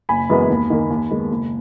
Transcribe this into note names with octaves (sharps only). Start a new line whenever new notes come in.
F#1 G#5 B5
F#2 E3 G#3 B3
D#2
D#3 A#3
D#2
D#3 G#3 B3
F#1